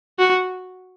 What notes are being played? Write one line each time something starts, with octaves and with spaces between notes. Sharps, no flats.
F#4